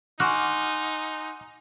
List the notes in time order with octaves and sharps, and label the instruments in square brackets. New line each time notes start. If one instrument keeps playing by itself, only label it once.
[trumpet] D#4 [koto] F#4 [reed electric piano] F#5 D6 F6 [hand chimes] G#5 C6 F#6